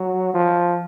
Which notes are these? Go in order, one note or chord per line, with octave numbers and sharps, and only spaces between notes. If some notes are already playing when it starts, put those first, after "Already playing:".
Already playing: F#3
F3